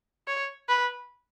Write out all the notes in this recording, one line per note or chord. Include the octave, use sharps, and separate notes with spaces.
C#5
B4